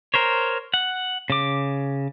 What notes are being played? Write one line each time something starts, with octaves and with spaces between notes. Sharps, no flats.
A#4 C5 C#5
F#5
C#3 D6